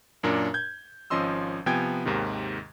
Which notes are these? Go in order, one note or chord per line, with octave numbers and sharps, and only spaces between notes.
F#2 A#2 D4 A#4
G6 G#6
G#1 F3 C#4 D#5 C6 E6
C3 F3 B3 G5 G#5 G#6
D#2 G#2 C3 D#3